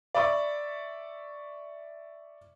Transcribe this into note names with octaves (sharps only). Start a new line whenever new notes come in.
D5 E5 B5 C#6 D6